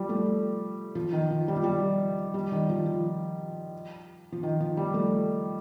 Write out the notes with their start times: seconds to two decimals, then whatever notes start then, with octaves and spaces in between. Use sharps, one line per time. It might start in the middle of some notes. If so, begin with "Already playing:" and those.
Already playing: F3 G3
0.09 A3
0.95 F3
1.13 D#3
1.31 F3
1.48 G3
1.56 F3
1.64 G3
2.34 G3
2.52 D#3
2.70 F3
2.86 F3
4.32 F3
4.43 D#3
4.60 F3
4.77 G3
4.94 A3